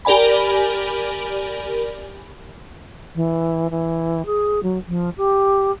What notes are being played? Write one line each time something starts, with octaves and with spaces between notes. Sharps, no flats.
G4 A#4 D5 G#5 B5
E3
E3
G#4
F#3
F3
G4